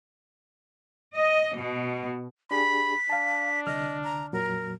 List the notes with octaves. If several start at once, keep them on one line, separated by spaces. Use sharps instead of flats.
D#5
B2
D4 G4 G#4 B5 B6
D4 F5 A5
C2 D3 D#5 F6
A#5
F2 A#2 F#3 A#4